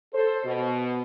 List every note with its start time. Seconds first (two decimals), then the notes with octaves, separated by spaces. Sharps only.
0.14 A4 C5
0.45 B2